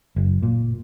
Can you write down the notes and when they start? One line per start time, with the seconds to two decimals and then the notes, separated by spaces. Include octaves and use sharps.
0.16 F#1
0.43 A#2